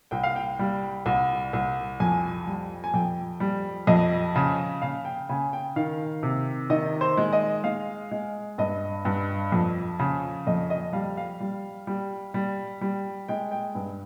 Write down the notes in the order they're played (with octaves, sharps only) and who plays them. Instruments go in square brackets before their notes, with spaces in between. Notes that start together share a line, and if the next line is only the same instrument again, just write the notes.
[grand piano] C2 G5
F5
G5
G3
C2
C2
F2 G#5
G3
G#5
F2 G5
G3
F2 D#5
C#3
C#3 F5
G5
C#3 G#5
G5
D#3 F5
C3
D#3 D#5
C5
G#3
D#5
G#3 F5
G#3
G2 D#5
G2
F2
C#3
F2 D#5
D#5
G3 F5
F5
G3
G3
G3
G3
G#3 G5
G5
G2